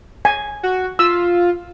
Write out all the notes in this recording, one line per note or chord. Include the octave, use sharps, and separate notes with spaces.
G#5
F#4
F4 E6